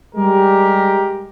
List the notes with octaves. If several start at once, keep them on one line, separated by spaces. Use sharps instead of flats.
G3 G#3 G4 A#4